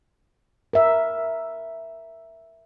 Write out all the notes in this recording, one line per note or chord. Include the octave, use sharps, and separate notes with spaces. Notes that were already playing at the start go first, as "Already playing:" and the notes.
A#4 E5